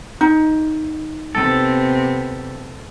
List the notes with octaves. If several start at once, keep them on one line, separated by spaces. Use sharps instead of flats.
D#4
C3 B3 A4